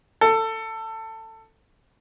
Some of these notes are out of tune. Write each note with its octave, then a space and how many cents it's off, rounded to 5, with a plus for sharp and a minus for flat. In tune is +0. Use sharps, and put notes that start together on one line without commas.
A4 +20